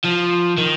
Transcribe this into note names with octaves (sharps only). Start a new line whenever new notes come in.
F3
D#3